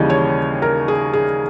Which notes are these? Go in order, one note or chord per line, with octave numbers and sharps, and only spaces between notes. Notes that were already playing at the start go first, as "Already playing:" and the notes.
Already playing: D#2 C#3 E3 G3 D#5
C#5
A#4
G#4
G#4